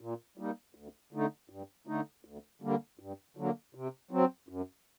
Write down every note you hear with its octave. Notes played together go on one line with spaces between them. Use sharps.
A#2
G3 A#3 D#4
D2
D3 A3 D#4
G2
D3 A3 D#4
D2
D3 G3 A#3
G2
D3 F#3 A#3
C3
F#3 C4
F#2